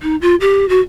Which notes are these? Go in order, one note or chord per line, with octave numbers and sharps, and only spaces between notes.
D#4
F4
G4
F#4